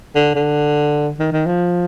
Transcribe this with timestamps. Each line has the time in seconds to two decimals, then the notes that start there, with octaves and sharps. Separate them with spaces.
0.15 D3
0.35 D3
1.19 D#3
1.32 D#3
1.46 F3